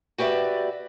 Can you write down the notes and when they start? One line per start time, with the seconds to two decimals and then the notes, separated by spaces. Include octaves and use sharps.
0.18 F#4 G4 B4 D5 E5